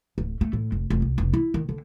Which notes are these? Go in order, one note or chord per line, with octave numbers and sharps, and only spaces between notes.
D1
A3
A2
F1
F1
C2
F1
E4
D#3
D3